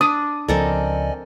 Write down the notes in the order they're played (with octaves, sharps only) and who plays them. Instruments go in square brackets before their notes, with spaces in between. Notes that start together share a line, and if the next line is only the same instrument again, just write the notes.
[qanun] D4 [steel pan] D#6
[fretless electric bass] C#2 F3 [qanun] C4 A4 A#4 [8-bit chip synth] D5 D#5 G#5